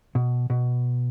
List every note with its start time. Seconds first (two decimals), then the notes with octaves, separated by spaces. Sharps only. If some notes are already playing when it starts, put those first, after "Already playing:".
0.15 B2
0.50 B2